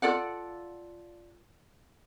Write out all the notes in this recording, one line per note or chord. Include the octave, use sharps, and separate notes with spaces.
F4 A4 D5 F#5